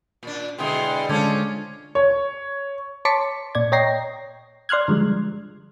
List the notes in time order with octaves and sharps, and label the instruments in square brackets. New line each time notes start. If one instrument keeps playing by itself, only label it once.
[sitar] A#2 D4
[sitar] B2 D3 G#3 [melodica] E4 G#4 G5 [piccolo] C6
[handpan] D3 G#3 [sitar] C#4 F4 [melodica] A4 C5 D5 [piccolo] G#6
[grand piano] C#5
[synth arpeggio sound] C#5 A5 C6 D6 B6 C#7
A#2 D5 G#6
C#5 D#5 G5 A#5 A#6 C7
D5 C6 F6 F#6 G#6
D3 F3 G3 G#3